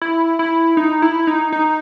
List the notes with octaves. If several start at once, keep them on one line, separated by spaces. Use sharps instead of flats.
E4
E4
D#4
E4
D#4
D#4